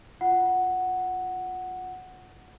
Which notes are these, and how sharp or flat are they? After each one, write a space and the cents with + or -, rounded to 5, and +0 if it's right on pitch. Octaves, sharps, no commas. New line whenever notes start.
F4 +0 F#5 +0